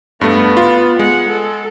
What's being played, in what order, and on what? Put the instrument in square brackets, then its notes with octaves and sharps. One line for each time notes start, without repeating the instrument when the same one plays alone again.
[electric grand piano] G2 A3 [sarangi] B3
[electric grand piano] F4
[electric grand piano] G#3 [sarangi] F#5
[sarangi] A4